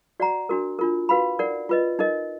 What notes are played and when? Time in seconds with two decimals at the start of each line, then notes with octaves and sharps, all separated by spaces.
0.20 F#4 D5 F#5 A#5
0.49 D4 F#4 A#4
0.79 D4 F4 A#4
1.09 F#4 B4 F5 B5
1.39 D#4 A#4 D5 F#5
1.69 F4 B4 D#5
1.99 D#4 A#4 D#5